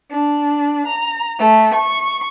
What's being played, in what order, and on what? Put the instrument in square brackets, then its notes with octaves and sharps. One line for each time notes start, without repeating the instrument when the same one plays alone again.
[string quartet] D4
A#5
A3
C#6